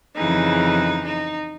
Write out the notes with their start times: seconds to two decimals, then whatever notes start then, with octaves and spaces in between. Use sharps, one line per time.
0.16 F2 C#3 E3 D#4
1.05 D#4